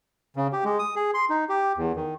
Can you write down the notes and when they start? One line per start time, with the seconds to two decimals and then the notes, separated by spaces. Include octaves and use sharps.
0.36 C#3
0.53 G4
0.65 G#3
0.79 D#6
0.96 G#4
1.14 C6
1.30 D#4
1.49 G4
1.77 E2
1.96 D#3